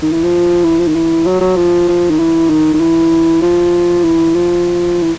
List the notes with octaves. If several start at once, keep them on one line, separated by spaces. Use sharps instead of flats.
D#3
E3
F3
E3
F3
D#3
E3
F#3
F#3
F3
F3
D#3
E3
D#3
D#3
E3
F3
E3
F3
E3